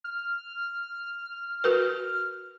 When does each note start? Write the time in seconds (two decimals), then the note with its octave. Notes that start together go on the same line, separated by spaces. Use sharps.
0.04 F6
1.64 F#4 A#4 B4